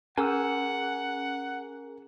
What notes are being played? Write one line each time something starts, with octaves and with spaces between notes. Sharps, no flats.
C#4 G#4 A#4 F#5 G#5 E6